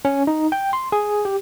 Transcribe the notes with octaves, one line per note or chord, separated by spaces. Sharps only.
C#4
D#4
G5
C6
G#4
G4